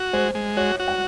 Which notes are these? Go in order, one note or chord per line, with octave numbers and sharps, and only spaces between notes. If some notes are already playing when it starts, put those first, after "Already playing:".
Already playing: F#4
G#3 C5
G#3
F#4 C#5
F#4
F#5